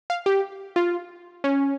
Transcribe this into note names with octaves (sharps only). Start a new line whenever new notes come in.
F5
G4
F4
C#4